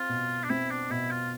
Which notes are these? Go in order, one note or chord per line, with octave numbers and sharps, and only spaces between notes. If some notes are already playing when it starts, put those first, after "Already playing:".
Already playing: C4 F4
B2
D4
C4 E4
D4
B2 E4
F4